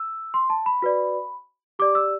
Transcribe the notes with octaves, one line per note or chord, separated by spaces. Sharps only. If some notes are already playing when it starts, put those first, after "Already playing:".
Already playing: E6
C6
A5
B5
F#4 B4 D5
G4 D5 D6
E6